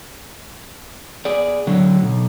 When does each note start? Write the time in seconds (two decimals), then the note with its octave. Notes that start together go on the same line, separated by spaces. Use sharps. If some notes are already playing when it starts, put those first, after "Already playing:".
1.25 G#4 D5
1.67 D3 F#3
2.02 B1